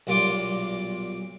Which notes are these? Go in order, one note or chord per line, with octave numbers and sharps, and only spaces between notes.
B1 A#2 G3 F4 C6 D6